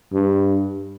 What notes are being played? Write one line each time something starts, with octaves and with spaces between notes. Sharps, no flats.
G2